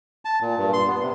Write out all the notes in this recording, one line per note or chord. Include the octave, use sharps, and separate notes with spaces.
A5
A#2
G2
C6
B3
C3